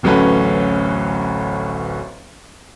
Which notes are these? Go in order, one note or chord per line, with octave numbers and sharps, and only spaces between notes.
D1 A1 F#3 A3 C#4 B4